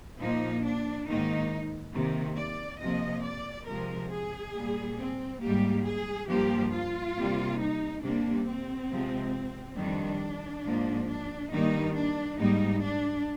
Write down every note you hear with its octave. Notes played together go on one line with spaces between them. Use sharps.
A#2 F3 A#3 D#4
D4
G#2 D#3 A#3 D#4
C3 D#3 A#3
D5
C3 F3 A#3 D#5
D5
C3 F3 G#3 A#4
G#4
A#2 G3 A#3
C4
G#2 G3 A#3 G4
G#4
G2 F3 A#3 G4
F4
C3 G3 A#3
D#4
C3 G3 A#3 D4
C4
C3 F3 G#3
F2 D#3 G3 D4
G#2 F3 A#3
D4
G2 D#3 G3 A#3 D#4
D4
G#2 G3 A#3 D#4
D4